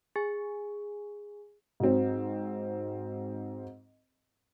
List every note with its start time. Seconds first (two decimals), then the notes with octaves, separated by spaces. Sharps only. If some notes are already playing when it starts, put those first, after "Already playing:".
0.16 G#4 G#5
1.80 G#2 F#3 C4